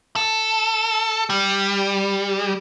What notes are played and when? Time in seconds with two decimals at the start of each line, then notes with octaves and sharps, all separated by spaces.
0.16 A4
1.30 G3